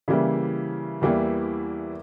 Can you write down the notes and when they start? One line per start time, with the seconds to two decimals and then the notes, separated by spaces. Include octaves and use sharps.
0.08 C#3 E3 G3 A#3 E4
1.02 E2 E3 G3 A#3 E4